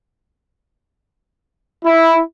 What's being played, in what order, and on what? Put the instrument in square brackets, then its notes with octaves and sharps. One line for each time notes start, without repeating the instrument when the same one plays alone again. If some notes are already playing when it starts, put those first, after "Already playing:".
[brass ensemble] E4